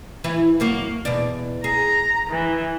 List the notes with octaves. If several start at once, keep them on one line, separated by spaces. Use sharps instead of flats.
E3 E4 B4
F#2 A#3 F#4
E2 B2 D5
G#4 A#5
E3